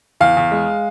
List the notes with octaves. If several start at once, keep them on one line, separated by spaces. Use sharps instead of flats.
E2 F5
E2
G#3